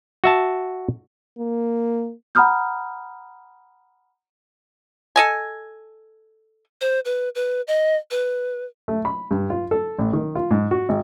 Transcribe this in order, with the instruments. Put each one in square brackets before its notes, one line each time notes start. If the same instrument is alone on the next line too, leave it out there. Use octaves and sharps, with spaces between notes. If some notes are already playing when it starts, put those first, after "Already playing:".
[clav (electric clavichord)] F#4 E5 A5
[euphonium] A#3
[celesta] F#5 A#5 B5 D#6 F6 G6
[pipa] A4 D#5 G#5
[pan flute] C5
B4
B4
D#5
B4
[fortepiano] A3
B5
G2
F4
A4
A1
D#3
F4
G#2
F#4
G#1